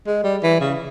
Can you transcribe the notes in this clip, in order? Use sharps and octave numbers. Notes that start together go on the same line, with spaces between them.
G#3
G3
E3
C#3